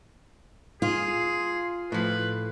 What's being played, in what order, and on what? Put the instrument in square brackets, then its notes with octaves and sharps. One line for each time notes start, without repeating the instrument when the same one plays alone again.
[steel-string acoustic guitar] F4 [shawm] G#4
[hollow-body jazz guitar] A2 F3 [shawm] B4